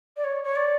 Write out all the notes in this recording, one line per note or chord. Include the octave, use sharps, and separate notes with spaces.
D5
C#5
C#5
D5